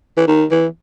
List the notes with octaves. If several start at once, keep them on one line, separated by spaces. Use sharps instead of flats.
E3
D#3
E3